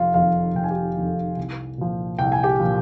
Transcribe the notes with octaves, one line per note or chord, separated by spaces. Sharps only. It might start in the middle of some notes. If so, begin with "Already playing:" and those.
Already playing: F1 F4 F5
F2 D#3 F4 F5
F1 G5
G#5
G4 G5
F2 D#3
C2
A#2 F3
C2 G5
G#5
G4 G5
A#2 F3